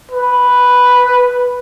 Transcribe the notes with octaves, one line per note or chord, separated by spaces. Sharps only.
B4